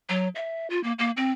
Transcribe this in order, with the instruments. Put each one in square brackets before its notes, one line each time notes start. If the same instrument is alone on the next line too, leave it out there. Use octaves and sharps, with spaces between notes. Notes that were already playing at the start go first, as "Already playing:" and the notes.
[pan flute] F#3
E5
F4
A#3
A#3
C4